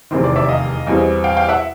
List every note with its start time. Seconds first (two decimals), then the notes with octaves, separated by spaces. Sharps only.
0.11 F1 E2 C3 D#3 C5
0.23 C5 D5
0.36 D5 E5
0.49 D#5 F5
0.87 E2 B2 G3 C4
1.24 F5 G5
1.36 F5 G5
1.49 E5 F#5